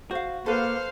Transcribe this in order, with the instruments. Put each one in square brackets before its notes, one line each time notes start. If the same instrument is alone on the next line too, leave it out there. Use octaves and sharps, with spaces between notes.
[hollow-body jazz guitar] F#4 [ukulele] C5 F5
[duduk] A#3 [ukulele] A4 B4 [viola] C5 F5